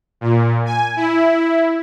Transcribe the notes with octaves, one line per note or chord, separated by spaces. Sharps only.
A#2
G#5
E4